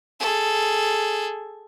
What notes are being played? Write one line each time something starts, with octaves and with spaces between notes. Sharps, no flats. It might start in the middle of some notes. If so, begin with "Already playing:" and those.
G#4 A4